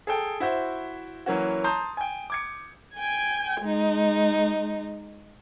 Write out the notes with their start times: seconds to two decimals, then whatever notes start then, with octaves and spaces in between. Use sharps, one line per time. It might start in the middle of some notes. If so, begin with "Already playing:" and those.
0.07 G#4 A4 G5
0.40 E4 F#4 C5 E5
1.26 E3 F#3 A#3 C#4 F#4
1.64 A5 A#5 C6 D#6 G6
1.97 G5 G#5
2.30 D6 G#6 C#7
2.96 G5 G#5 G#6
3.61 G#3 D#4